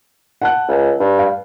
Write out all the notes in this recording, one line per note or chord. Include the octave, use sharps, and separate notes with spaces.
F#5 A5 F#6
C#2
G2
F5